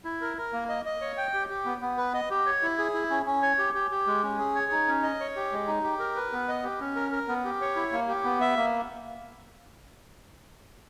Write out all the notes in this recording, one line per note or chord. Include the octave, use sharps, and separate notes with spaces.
E4
A#4
A#4
A#3
D#5
D#5
C#5
G5
G4
G4
B3
B3
B4
D#5
G4
C#5
E4
G#4
E4
C#4
C#4
C#5
G4
G4
G4
G#3
C#4
G#4
C#5
D#4
C#4
D#5
C#5
G4
G#3
D#4
G4
A#4
B4
B3
D#5
G4
C#4
A#4
A#4
B3
G4
C#5
E4
A#3
G4
B3
E5
A#3